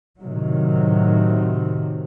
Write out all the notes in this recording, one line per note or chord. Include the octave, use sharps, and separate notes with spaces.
A2 C3 D#3 F#3